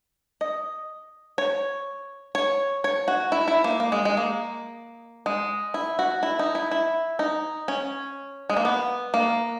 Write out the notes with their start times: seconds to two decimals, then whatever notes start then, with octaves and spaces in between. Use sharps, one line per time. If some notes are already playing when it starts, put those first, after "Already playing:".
0.41 D#5
1.38 C#5
2.35 C#5
2.84 C#5
3.08 F#4
3.32 E4
3.48 E4
3.64 A#3
3.80 A#3
3.92 G#3
4.05 G#3
4.17 A#3
5.26 G#3
5.74 E4
5.99 F#4
6.23 E4
6.39 D#4
6.55 E4
6.71 E4
7.19 D#4
7.68 C#4
8.50 G#3
8.57 A#3
8.65 B3
9.14 A#3